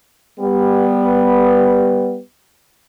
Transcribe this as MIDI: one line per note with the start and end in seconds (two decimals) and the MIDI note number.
0.40 2.19 55
0.40 2.19 59